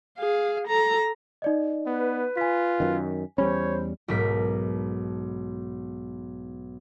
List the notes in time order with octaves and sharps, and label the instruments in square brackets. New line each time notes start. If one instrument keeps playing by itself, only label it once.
[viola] G#4 F5
A4 A#5
[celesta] D#4 D5 D#5
[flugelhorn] B3 [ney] B4
[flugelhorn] F4 [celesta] G#5 B6
[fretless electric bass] F#2 D#3
[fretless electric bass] E2 G3 C#4 [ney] C5 [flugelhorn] C#5 [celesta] B5
[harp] B1 G#2 B2 A#4 B6